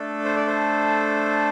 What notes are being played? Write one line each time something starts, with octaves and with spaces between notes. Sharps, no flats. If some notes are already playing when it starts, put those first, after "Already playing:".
Already playing: A3 D4 A4
C5
D5
C5